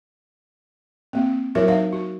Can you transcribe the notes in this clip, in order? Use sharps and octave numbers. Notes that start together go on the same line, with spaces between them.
A#3 C4
F#3 E4 F#4 A#4 C#5 E5
D#4 E5 F5
F#4